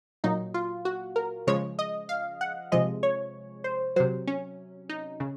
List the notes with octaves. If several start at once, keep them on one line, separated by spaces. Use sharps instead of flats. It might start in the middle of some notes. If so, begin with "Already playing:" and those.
A#2 F#3 D#4
F4
F#4
A#4
C#3 F3 G#3 C#5
D#5
F5
F#5
C3 F3 G#3 D#5
C#5
C5
C3 F#3 C5
C#4
D#4
C#3